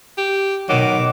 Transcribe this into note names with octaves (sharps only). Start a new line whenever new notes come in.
G4
B2 D#3 F#3 D6